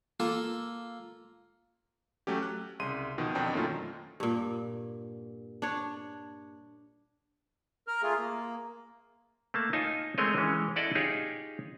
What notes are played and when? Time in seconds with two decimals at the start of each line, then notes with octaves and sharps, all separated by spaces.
0.20 A#3 F4 A4
2.27 F#3 A3 C#4 G4
2.42 F#6
2.79 C2 C#3 C6 D#7
3.18 B2 D#3 F3
3.35 F2 B2 C4 D4 G5
3.53 F#2 D#3 A3 A#3 C#4 F4
4.20 G2 A#2
5.62 D4 C#5
7.88 A#4 F6
8.02 A3 F4 G#4
8.19 A#3
9.54 A3 A#3 A5
9.73 D#4 F4 C#5 G#5 A5
10.18 G#3 A3 C4 A#4 C#5 D#5
10.37 E3 G#3 C#4
10.76 E4 A4 D5 D#5 F#5 A5
10.95 D#4 F4 G4 G#4 C#5